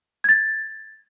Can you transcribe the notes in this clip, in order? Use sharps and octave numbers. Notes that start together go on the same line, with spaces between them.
G#6 A6